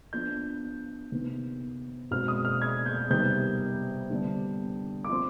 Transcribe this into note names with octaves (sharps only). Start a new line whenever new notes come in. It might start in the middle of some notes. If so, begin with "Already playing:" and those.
F3 B3 D4 G6
C3 D#3 B3
B2 G#3 C4 F6
D#6
F6
G#6
G6
C3 D#3 G3 B3 G6
D3 G3 B3 D4
D6
F3 C4 C6